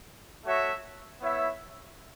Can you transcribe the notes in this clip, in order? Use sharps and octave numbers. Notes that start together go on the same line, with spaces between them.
A3 F#4 C#5 E5
B3 E4 C#5 E5